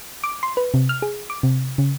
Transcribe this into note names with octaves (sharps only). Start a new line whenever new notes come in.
D6
C6
B4
C3
F6
G#4
D6
C3
C#3